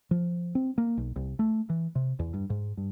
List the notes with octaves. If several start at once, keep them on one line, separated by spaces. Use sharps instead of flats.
F3
C4
A#3
B1
C2
A3
E3
C3
E2
G2
G#2
G2